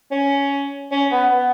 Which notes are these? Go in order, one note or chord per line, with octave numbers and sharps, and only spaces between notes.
C#4
C#4
B3
B3